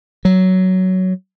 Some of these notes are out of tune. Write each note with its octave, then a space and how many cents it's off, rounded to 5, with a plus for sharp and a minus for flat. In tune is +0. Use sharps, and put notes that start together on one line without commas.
F#3 +10